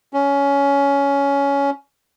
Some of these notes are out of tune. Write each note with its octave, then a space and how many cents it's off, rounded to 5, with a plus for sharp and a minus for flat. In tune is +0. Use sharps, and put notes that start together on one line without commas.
C#4 +15